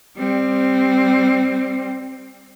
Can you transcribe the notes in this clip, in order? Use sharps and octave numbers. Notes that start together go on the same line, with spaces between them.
G3 C4